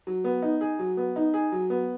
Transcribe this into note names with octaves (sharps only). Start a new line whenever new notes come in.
F#3
B3
D#4
G#4
F#3
B3
D#4
G#4
F#3
B3